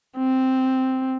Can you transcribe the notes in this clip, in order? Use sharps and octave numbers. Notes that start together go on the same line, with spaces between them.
C4